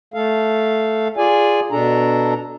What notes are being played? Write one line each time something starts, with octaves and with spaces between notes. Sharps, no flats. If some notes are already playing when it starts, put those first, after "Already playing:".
A3 A4 F5
F4 G#4 D5 G#5
B2 D4 A4 A#5